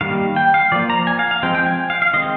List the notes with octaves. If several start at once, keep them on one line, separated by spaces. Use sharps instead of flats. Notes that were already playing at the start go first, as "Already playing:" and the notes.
D#3 G3 A#3 F5
G5
F5
F3 A#3 D5
A#5
G#5
F5
F5
F3 G#3 C4 G5
G5
G#5
F5
F5
D#3 G#3 C4 D#5